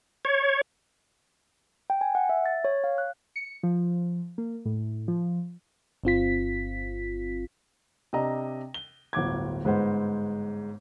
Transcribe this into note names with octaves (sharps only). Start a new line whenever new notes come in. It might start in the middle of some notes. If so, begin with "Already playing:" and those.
C#5
G5
G#5
F#5
E5
A6
C#5
F5
F#6
C#7
F3
A#3
A2
F3
G1 C4 F4 B6
C3 D4 D#5 A#5
G7
D1 G1 D6 G#6
G1 G#2 G#3 B4 C5 F#5